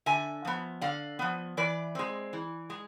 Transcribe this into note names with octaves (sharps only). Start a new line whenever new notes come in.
D3 E5 G#5
F3 B3
D3 D5 F5
F3 B3
E3 B4 D5
G#3 C4
E3
G#3